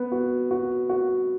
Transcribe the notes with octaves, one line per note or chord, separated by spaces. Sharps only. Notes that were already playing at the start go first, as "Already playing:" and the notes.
Already playing: B3
F#4
F#4
F#4